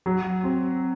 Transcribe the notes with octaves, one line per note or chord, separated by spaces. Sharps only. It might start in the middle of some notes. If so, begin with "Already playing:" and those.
F#3
C4